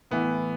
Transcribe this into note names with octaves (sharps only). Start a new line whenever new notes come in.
A2 E3 B3